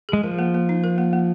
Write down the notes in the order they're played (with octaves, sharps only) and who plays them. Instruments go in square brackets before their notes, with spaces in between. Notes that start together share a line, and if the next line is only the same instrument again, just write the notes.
[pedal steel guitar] G#3 [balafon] G#4
[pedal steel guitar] F3 [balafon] A#4
[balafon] A#3
A#3
D#4
A#4
A#3
A#3